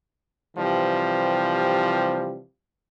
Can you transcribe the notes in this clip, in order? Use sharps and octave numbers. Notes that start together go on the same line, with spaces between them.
C3 E3 F3 G3